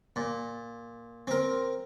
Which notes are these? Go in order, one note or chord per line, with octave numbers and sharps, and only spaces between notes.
A#2
C4 A#4